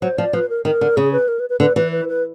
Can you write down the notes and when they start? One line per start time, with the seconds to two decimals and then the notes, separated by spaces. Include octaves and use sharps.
0.02 F#3 C5
0.18 F3 D5
0.33 F3 B4
0.50 A#4
0.65 D#3 A#4
0.81 D3
0.97 C#3 G#4
1.13 B4
1.28 A#4
1.40 B4
1.50 B4
1.60 D3 B4
1.76 E3 B4
1.92 B4
2.08 B4